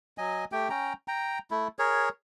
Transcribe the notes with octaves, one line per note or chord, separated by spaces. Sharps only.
F#3 D#5 G#5
A3 G4 G5
C#4 G5 A#5
G5 A#5
A3 E4
G#4 A#4 C#5